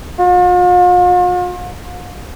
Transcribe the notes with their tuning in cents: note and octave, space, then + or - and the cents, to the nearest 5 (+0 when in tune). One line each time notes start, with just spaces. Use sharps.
F4 +45